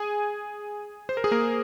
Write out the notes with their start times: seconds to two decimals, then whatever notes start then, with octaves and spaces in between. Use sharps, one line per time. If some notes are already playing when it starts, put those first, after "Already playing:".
Already playing: G#4 G#5
1.09 C5
1.17 A#4
1.24 G#4
1.31 A#3 A#4